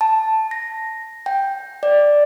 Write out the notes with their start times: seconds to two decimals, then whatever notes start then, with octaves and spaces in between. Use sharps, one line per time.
0.01 A5
0.51 A#6
1.26 G5
1.83 D5